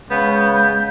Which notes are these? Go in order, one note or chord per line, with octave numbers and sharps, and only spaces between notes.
C#3 G#3 B3 G6